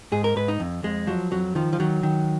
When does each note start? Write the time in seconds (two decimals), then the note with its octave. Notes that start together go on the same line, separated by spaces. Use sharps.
0.12 G#2 G#4
0.24 A#4
0.36 G#2 B4
0.48 D#4
0.60 F2
0.83 F2 G#3
1.07 F3 F#3
1.31 F2 F#3
1.55 D#3 F3
1.73 F3
1.80 D#3 F#3
2.03 D#3